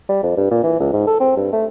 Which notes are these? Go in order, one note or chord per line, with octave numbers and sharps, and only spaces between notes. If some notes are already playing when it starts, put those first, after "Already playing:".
G3
F2
G2
A#2
E3
C#2
G#2
A4
C4
G2
A3